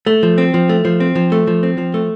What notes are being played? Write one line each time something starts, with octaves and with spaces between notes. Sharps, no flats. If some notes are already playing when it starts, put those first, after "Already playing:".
A3
F3
C4
F3
A3
F3
C4
F3
A3
F3
C4
F3
A3